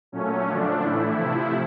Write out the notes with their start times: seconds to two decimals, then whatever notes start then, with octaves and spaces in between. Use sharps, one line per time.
0.12 A#2 F#3 A3 C#4
0.47 D3 F3 A3 D4
0.83 A2 E3 A3 E4
1.18 C3 F3 A3